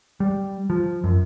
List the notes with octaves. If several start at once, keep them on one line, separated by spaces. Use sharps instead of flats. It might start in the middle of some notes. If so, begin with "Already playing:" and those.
G3
F3
F#2